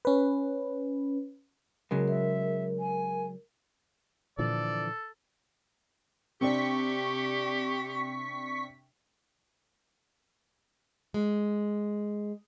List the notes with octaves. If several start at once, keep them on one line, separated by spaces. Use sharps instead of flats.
C#4 B4
C#3 F#3 G#3 A#4
A#4 E5
G#5
A#2 D3 E3 F3 A4 D5
C3 C4 D4 G4 C#6 B6
G#3